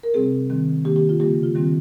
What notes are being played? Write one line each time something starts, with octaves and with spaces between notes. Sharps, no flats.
A#4
C3 G3 C4 G#4
D#3 G3 C4
D#3 A#3 G4
G4
F4
C#3 G3 A#3 G4
F4
D#3 G3 C4